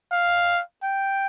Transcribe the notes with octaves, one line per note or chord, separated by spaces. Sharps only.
F5
G5